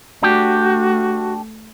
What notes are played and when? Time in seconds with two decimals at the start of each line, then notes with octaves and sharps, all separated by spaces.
0.23 A3 D4 F#4 G4